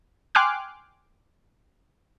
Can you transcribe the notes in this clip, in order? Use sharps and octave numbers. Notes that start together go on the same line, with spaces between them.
G5 G#5 C6 D6 F6 F#6